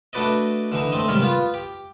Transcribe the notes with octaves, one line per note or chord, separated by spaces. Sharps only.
A3 D4 F#4 B4 D5 D#5
D3 E3 D#4
A3 C4 D#5
G#2 C3 D#3 G3 C#4
B3 F4
G4